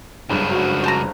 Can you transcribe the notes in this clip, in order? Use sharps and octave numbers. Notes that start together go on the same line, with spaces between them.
F#1 C#2 G2 F3
F#4
C5 A5 A#5